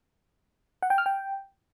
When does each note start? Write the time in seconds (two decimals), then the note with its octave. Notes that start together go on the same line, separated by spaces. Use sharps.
0.82 F#5
0.90 G5
0.98 F6
1.06 G5